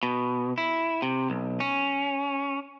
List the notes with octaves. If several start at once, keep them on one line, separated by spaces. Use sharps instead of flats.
B2
E4
C3
B1
C#4